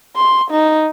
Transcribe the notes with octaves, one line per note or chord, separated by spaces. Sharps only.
C6
D#4